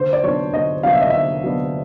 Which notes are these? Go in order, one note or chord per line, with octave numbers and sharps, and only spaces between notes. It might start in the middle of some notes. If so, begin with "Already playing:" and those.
Already playing: D3 C5
D5
F#3 B3 D4 C#5
D3 D#5
F#3 B3 D4 F5
E5
D#5
D3 E5
F#3 B3 D4